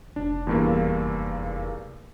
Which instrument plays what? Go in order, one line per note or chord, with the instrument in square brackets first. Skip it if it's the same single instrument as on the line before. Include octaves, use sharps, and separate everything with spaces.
[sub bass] F1 [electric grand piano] D4
[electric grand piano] E2 G2 A#3